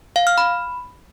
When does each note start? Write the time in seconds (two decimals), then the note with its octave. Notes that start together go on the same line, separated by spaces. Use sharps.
0.16 F5
0.27 F6
0.38 B5